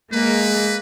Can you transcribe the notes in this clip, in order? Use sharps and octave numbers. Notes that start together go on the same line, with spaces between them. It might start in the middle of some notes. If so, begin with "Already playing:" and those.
G#3 A#3 B4